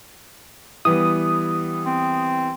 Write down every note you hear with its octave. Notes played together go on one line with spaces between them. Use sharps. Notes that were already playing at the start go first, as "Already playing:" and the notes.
E3 G3 B3 D#6
C4